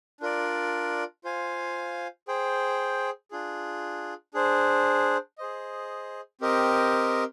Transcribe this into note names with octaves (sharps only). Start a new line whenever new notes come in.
D4 F4 A#4 D5
F4 C5 F5 G#5
G#4 C5 G5
D4 F4 G#4
D4 G#4 C5
G#4 C5 D#5
C4 G4 A#4 D#5